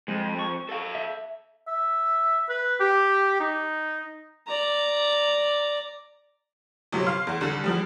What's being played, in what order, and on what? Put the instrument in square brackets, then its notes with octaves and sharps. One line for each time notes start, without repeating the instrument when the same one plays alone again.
[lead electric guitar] F2 [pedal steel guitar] G#3
[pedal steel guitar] C#6
[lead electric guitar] A4 F5
[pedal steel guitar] E5
[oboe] E5
B4
G4
D#4
[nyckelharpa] D5 A#5
[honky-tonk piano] G1 C3 F#3
F5 C6
E2
C2 D3
E2 F3 G3